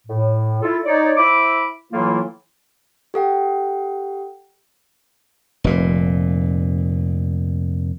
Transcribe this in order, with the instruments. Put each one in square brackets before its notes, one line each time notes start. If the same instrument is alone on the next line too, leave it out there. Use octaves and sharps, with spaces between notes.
[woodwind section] A2
E4 F4 A4
D#4 C#5 D5
E4 C5 E5 B5 D6
A2 E3 F#3 A#3 E4 F4
[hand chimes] G4 A4 F#5 G5
[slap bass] F1 A#2